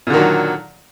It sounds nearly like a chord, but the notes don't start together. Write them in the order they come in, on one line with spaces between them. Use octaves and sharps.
A#2 D3 D#3 F#3